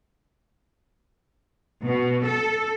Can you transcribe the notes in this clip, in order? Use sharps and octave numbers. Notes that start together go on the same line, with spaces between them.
B2
A4